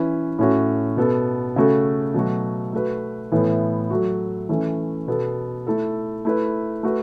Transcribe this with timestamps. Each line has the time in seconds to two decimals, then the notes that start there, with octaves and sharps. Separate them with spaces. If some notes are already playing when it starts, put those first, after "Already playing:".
Already playing: E3 C#4 E4 B4
0.39 A2 A3 C#4 F#4
0.97 B2 B3 A4
1.56 C#3 A3 F#4 A4
2.14 B2 F#3 A3 F#4
2.73 A3 F#4 B4
3.32 A2 E3 B3 A4
3.90 F#3 A3 F#4
4.49 E3 A3 C#4 A4
5.07 B2 B3 A4
5.67 A3 E4 A4
6.25 A3 E4 B4
6.83 A3 F#4 B4